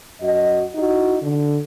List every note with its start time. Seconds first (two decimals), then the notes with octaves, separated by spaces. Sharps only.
0.21 F#2 F#4 D#5
0.75 D#4 E4 F#4 D#5
1.22 D3